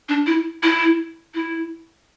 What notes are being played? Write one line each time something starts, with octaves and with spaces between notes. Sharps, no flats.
D4
E4
E4
E4